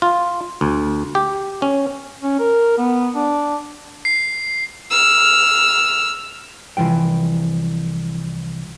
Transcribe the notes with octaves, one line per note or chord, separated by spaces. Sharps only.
F4
D2
G4
C#4
C#4
A#4
B3
D4
C7
E6 F6
C2 B2 E3 F3 G5